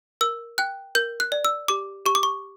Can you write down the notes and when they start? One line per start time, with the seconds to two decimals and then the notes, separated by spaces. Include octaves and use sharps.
0.21 A#4 E6
0.58 G5 F#6
0.95 A#4 G6
1.20 F#6
1.32 D5
1.45 E6
1.68 G4 D6
2.06 G4 C#6
2.15 D6
2.23 C#6